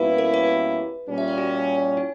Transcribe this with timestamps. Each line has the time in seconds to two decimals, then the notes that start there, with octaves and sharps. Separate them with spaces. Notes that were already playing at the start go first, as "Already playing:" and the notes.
Already playing: B2 G3 A#3 C#4 E4 B4
0.18 A#4
0.34 B4
1.09 A#2 G3 C#4
1.18 E5
1.28 D5
1.38 F#4
1.97 E4